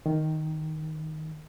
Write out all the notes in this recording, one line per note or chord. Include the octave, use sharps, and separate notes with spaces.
D#3